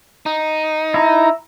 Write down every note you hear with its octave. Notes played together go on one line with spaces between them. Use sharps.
D#4
E4 A#5